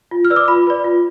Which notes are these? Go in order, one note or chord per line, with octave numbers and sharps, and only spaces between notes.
F4
F6
B4 D5 E6
D6
F4 B5
B4 D5
F4